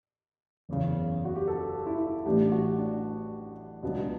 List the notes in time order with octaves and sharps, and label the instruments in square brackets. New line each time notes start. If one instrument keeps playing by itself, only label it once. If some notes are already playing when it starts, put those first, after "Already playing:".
[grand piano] F#1 E2 C#3
F#4
G4
A4
E4
A1 A2 G3 D4 G4
F#4
D4
C#2 B2 F#3 B3 D4